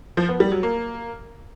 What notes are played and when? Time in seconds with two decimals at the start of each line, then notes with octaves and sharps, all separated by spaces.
0.17 F3
0.29 B3
0.40 G3
0.52 F#3
0.63 A#3